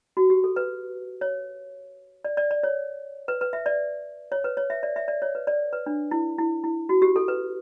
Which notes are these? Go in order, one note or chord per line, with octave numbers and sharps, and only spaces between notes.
F#4
G4
A4
B4
C#5
D5
D5
D5
C#5
B4
B4
E5
D5
C#5
B4
C#5
E5
D5
E5
D5
C#5
B4
D5
B4
D4
E4
E4
E4
F#4
G4
A4
B4